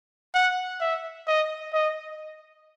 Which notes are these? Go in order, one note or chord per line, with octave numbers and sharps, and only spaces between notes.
F#5
E5
D#5
D#5